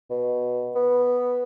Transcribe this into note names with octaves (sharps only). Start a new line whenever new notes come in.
B2
B3